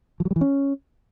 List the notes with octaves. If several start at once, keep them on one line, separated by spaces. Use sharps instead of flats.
F3
F#3
G3
E3
C#4